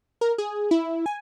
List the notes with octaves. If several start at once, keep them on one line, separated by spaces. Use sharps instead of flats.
A#4
G#4
E4
G#5